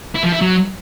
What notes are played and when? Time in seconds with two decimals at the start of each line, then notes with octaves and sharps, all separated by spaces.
0.15 E4
0.24 F3
0.33 E4
0.42 F#3